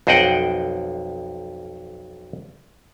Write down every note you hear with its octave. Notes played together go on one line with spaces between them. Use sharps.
B1 F2 C5 D#5 F#5 G5